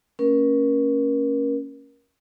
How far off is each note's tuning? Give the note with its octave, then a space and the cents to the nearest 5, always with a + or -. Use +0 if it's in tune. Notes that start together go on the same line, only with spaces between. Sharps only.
A#3 -35 C#4 +0 A#4 +30